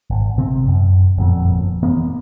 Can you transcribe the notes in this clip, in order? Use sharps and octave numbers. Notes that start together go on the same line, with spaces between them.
G#1
C3 C4
F#2
G1 F2 A#2
E3 A#3 B3